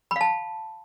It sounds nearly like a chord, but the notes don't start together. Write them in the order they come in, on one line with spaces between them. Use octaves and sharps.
B5 F5 A5